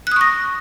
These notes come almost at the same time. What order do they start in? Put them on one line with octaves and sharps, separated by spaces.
F#6 D#6 C#6 A#6